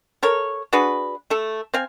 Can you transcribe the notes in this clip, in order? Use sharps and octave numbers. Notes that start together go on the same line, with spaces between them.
A4 A#4 C#5
D4 F#4 G#4 B4
A3 A4
C4 F5 G#5